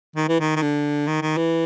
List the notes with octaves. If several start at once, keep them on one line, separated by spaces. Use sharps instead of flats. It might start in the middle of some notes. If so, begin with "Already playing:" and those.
D#3
E3
D#3
D#3
D3
D#3
D#3
E3